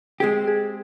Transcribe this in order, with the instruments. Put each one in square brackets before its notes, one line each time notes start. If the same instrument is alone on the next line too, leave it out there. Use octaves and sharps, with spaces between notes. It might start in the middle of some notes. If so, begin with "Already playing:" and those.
[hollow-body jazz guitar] G#3 C4 G4 [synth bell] G#4
[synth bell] G#4